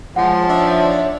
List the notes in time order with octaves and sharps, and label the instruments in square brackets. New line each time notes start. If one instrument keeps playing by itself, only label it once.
[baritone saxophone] F3 [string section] G#3 C#5 [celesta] F#5
[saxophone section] D4 D#4 E5 [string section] C#5 D5